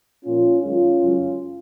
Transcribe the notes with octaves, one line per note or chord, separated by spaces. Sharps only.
A#2 F3 A#3 C#4 F4
F#2 D#3 G#3 C#4 F4
F#2 C#3 G#3